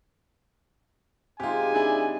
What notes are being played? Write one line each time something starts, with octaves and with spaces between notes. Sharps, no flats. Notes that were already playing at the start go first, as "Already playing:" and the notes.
C3 G#3 D#4 F4 G4 G#5
D4 E4 G#4